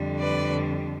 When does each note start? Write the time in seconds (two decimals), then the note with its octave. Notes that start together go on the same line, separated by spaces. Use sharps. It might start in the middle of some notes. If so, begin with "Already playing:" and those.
Already playing: F2 D3 G3
0.20 B4 D5